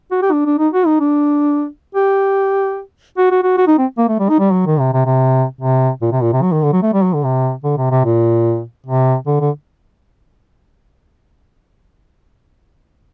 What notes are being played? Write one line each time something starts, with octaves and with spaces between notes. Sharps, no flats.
F#4
G4
D4
D4
D#4
F#4
D#4
D4
G4
F#4
F#4
F#4
F#4
D#4
C4
A#3
A3
G3
D#4
G3
F#3
D#3
C3
C3
C3
C3
A#2
C3
A#2
C3
F#3
D#3
D3
F#3
A3
G3
F#3
D3
C3
D3
C3
C3
A#2
C3
D3
D3